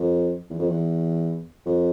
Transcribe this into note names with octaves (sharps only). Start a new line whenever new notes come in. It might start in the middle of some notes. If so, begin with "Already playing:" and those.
Already playing: F2
E2
F2
E2
F2